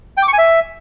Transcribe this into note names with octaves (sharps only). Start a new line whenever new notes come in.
G5
D6
C#6
G#5
E5